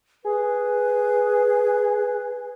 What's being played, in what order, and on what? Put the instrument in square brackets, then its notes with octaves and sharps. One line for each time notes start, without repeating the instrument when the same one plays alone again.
[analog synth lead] G#4 [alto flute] B4